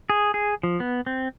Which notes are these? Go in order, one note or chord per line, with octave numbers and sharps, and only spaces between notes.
G#4
G#4
F3
B3
C4